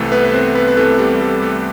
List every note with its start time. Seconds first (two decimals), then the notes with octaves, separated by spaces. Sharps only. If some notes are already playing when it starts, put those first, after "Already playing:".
Already playing: C2 C3 E3 A3 A4
0.12 B3 B4
0.25 B4
0.34 C4 C5
0.55 B3 B4
0.68 B4
0.77 C2 C3 E3 A3 A4
0.99 G3 G4
1.21 A3 A4
1.42 A3 A4